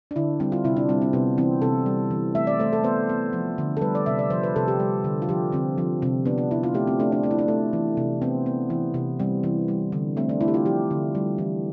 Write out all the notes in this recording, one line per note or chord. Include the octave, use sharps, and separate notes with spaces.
D4
D3 E4
G3 C4
F4
C3 E4
D4
G3 C4
C4
C3 B3
E3 C4
C3 A4
G3
E3
A3 E5
D5
A3 C5
A4
B3 C5
B3
F3
D3
A4
G3 B4
D5
C3 E5
D5
F3 C5
B4
C3 A4
G4
G3
D3
F4
F3 G4
D3 C4
F3
C3
B3 D4
D4
B3 E4
F4
A3 G4
C4
A3 D4
D4
A3 D4
E4
D4
A3
E3
C3
B3 C4
B3
E3
C3
G3 C4
E3
G3
D3
A3 C4
D4
A3 E4
G4
F4
F3 G4
D3
G3
E3